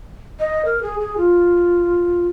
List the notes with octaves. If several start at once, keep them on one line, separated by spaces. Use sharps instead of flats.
D#5
A#4
G#4
G#4
F4